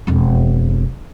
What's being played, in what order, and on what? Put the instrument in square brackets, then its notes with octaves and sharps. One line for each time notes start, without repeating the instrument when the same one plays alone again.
[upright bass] E1 F2